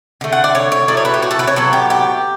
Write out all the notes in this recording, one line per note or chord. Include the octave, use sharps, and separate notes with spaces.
D3 A3
F#5
D5
C#5
C#5
A2 F#3 A3 D5
C#5
B4
G4
F#4
A4
B4
C#5
A2 F#3 B3 A4
G4
G4